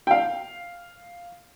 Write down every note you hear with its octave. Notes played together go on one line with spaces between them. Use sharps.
G5
F5